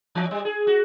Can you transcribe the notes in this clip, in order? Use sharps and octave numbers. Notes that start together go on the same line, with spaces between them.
E3
G3
G#4
F#4